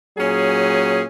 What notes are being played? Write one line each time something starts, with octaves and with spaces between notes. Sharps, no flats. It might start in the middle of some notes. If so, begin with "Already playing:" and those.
A#2 F#3 C#4 G#4